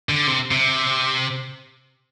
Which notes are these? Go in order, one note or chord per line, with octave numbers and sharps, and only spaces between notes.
D3
C3
C3